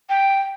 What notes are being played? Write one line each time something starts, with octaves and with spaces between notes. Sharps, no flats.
G5